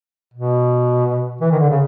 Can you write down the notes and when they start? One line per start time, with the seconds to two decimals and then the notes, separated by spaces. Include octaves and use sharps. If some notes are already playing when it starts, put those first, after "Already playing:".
0.34 B2
1.41 E3
1.51 D#3
1.59 D3
1.69 C#3